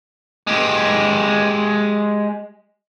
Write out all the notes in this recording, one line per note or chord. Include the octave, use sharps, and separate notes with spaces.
G#3 G4